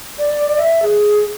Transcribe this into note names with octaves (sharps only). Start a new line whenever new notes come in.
D5
E5
G#4